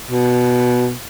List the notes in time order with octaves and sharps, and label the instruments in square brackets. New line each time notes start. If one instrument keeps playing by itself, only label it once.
[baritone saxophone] B2